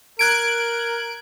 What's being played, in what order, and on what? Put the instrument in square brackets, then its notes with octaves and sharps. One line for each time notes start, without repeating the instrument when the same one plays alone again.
[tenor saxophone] A#4 [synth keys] F#6 G#6 D7